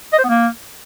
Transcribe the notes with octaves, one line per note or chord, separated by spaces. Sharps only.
D#5
C5
B3
A#3